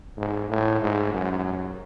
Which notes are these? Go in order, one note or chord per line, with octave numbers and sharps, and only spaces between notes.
G#2
A2
G#2
F#2